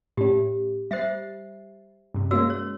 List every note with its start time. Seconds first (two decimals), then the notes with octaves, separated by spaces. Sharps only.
0.17 A2 C#4 G4
0.91 G3 C5 E5 A6 C7
2.14 G2 C3
2.31 G#3 A#3 C#4 F#4 E6
2.50 C#5